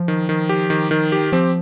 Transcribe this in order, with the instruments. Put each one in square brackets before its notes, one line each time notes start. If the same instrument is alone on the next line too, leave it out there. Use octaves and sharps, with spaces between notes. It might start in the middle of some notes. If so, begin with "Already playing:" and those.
Already playing: [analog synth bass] F3
[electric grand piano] D#3
D#3
G4
D#3
D#3
G4
[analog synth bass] F3 [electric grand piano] C4